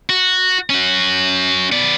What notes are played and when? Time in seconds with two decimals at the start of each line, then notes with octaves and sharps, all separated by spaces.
0.10 F#4
0.70 C#4 F#4
1.72 B3 D5